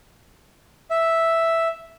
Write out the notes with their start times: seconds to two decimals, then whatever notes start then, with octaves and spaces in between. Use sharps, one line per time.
0.91 E5